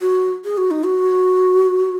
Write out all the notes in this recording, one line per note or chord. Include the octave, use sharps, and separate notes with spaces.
F#4
G#4
F#4
D#4
F#4